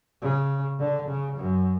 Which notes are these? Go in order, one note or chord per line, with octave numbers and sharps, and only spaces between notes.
C#3
D3
C#3
F#2